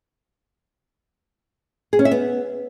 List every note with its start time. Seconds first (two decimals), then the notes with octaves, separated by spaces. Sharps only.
1.93 G#4
1.99 C#4
2.05 E5
2.12 B3